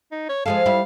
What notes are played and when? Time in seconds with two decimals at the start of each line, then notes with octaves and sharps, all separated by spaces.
0.12 D#4
0.29 C#5
0.46 F3 G#3 A4 F5
0.66 G3 E4